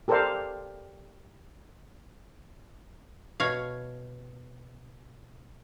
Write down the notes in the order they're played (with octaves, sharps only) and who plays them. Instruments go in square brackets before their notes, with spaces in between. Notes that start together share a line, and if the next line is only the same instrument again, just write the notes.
[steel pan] G4 A4 A#4 C5 D5 F5
[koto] B2 C#5 F5